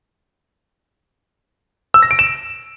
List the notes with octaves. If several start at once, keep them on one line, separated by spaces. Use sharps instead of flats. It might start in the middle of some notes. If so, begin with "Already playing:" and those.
E6
A#6
D7
E7